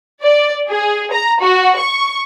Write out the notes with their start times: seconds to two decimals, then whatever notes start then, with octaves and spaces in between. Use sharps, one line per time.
0.23 D5
0.70 G#4
1.12 A#5
1.42 F#4
1.78 C#6